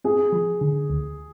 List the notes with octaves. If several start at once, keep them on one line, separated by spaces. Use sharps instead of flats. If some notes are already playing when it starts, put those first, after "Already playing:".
C4 G#4
F3
D3
D2